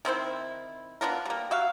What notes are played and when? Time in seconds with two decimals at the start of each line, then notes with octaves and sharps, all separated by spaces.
0.05 D#3 C4 E4 C5
1.01 B3 D4 F4 A#4
1.25 G3 A#3
1.51 F#4 E5 F5